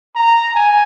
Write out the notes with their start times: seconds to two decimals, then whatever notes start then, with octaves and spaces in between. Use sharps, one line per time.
0.16 A#5
0.54 G#5